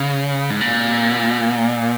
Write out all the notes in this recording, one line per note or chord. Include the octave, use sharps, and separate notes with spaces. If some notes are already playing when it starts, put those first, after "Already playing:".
Already playing: C#3
G#2
A#2